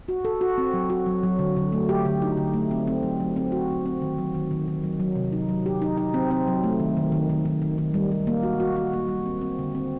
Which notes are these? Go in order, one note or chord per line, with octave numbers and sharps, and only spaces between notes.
F#4
A4
F#4
C4
F#3
F#4
F#3
F#3
D3
D3
A3
G4
D3
D#4
D3
A3
C4
C4
F#3
F#3
C4
F#4
F#3
C4
D#3
F#3
D#3
D#3
D#3
F#3
F#3
C3
D#4
F#3
G4
D#4
D#4
C4
C4
F#3
A3
D#3
D#3
D#3
D#3
D#3
D#3
D#3
G3
G3
A#3
F#4
F#4
F#4
A#3
G3
C4
C4
D3
C4